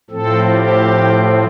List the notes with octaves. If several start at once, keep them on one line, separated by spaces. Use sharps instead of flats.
A2 F3 C4 A4
G4